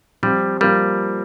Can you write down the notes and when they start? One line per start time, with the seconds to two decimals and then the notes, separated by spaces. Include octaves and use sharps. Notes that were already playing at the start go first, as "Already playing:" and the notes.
0.23 F3 G3 C4 G4
0.61 F3 G3 A#3 F4 A#4